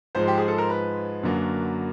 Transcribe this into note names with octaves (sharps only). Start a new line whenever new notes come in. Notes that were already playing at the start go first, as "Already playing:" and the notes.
G#2 F3 G#3 C5
G4
G#4
A4
A#4
B4
F#2 D3 F#3 A#3